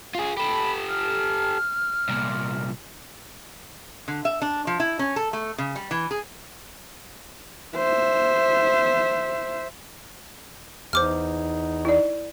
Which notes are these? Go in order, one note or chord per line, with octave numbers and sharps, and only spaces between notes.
F4 G#4
G4 A4 B5
F6
C2 A#2
D3
E5
D4
F3
E4
C#4
A4
A3
C#3
G3
E3
G#4
C5 E5
E2 D#4 C5 D6 F6
E4 D5